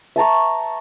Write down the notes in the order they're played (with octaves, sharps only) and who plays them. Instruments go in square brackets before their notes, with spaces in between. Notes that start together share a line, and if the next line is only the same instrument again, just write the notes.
[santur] E5 A5 A#5 C#6